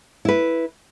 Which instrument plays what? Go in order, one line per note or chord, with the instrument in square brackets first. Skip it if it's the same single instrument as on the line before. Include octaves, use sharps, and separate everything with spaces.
[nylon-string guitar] E4 B4